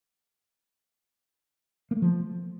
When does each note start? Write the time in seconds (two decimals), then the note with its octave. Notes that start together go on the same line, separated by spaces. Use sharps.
1.91 A#3
1.97 A3
2.02 F3